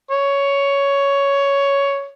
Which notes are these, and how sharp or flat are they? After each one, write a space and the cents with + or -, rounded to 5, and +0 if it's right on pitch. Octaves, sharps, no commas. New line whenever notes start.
C#5 +10